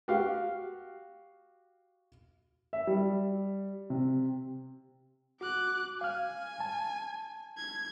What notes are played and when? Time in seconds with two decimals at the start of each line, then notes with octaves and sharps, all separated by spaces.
0.08 F#4 G4 F5
2.73 E5
2.87 G3
3.90 C3
5.41 F#4 D6 F#6
6.01 F5 G#5 F6
6.60 A5
7.58 G#6